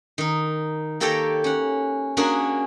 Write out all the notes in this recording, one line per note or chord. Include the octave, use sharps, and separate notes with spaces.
D#3 D#4
A#3 G4 A4 C#5 G5 A#5
C#4 F#5
A#3 C#4 D4 F#4 G#4 A#4